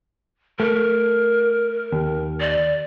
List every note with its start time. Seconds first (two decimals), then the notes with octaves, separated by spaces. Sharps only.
0.60 A3 A#4
1.92 D#2
2.41 D5